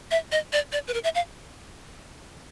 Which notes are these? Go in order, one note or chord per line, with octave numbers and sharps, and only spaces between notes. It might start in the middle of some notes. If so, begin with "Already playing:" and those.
E5
D#5
D5
D5
B4
A#4
E5
F5